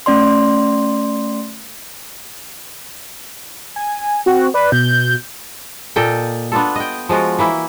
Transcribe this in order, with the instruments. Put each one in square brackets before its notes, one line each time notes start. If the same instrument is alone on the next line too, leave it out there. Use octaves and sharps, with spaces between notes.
[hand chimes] A3 C#4 D5 C6
[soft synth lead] G#5
[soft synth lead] C4 [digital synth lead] F#4
[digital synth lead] B4 [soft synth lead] D5
[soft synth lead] B2 [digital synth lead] G6
[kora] A#2 A4 D#5 G5
B3 D4 F4 A4
D#5 G5
F3 G#3 F4 F#4
E3 A#3 E4